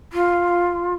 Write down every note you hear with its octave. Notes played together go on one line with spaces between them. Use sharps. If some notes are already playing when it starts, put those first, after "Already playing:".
F4